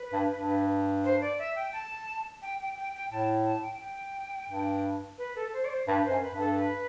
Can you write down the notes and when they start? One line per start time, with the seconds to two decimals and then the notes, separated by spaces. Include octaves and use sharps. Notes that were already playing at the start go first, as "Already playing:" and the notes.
Already playing: B4
0.13 G2
0.35 G2
1.04 C5
1.21 D5
1.39 E5
1.56 G5
1.73 A5
2.42 G5
2.60 G5
2.77 G5
2.94 G5
3.11 A2 A5
3.46 A5
3.63 G5
3.81 G5
4.49 G2
5.18 B4
5.36 A4
5.53 C5
5.65 D5
5.70 C5
5.87 G2 B4
6.04 C5
6.10 F#2
6.22 B4
6.33 G2
6.39 A4
6.56 B4